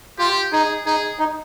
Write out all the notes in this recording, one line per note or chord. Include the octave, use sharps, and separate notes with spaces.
F4 G4
D#4 G#4
D#4 G#4
D#4